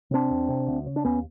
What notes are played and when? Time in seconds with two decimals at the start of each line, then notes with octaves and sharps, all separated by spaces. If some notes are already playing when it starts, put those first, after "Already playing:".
0.11 C3 C4 D4
0.30 E2
0.49 C3
0.67 D2
0.86 C#3
0.96 D4
1.05 D#2 B3 C#4